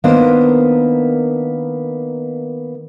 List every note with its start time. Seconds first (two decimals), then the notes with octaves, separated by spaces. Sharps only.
0.04 D#3 A#3 B3 D4 A#4 C5